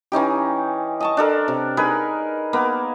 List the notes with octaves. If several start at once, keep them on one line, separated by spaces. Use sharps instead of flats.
E3 C#4 D#4 G4
D#5 A5 C#6
D4 A4 A#4
C3
D#4 G#4 A#4 B4
A#3 B3